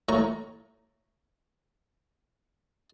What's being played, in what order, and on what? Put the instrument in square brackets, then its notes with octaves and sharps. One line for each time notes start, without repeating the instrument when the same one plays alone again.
[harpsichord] A2 A#5 C#6